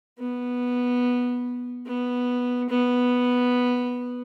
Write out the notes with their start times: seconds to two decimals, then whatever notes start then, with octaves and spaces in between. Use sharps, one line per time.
0.19 B3
1.86 B3
2.70 B3